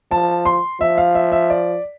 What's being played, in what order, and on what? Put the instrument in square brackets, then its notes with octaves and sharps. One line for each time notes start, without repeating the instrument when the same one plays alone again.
[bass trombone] F3 [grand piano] A5
[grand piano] C6
[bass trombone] F3 [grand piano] E5
[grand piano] F5
E5
E5
D5